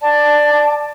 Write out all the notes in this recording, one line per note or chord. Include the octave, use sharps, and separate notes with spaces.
D5 A5